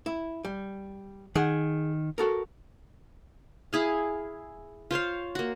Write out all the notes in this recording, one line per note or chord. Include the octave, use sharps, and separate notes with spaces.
E4
G3
D#3 G#4 F#5
F#4 A4 A#4
E4 G#4 F5
F4 C5 C#5 F5
A#3 F#4